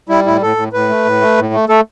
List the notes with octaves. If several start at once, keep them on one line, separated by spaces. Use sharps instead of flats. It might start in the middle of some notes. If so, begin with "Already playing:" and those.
G3 E4
A2 E4
A2 A4
A2
A2 B4
A3
A2
A3
A2
A3
A3 A4